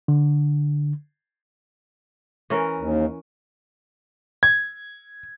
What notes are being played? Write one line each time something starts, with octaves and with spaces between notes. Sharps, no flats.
D3
E3 C#4 A#4
D#2
G#6